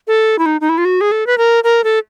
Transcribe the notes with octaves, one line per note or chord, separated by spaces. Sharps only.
A4
E4
D#4
D#4
E4
F4
F#4
G#4
A4
B4
A#4
A#4
A4